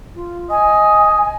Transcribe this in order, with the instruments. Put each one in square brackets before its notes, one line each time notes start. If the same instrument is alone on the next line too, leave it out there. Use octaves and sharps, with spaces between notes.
[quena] F4
[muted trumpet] D#5 [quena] G#5